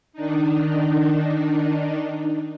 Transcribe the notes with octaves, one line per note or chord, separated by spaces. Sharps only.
D#3 D4 D#4